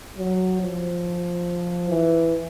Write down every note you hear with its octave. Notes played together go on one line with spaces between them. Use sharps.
F#3
F3
E3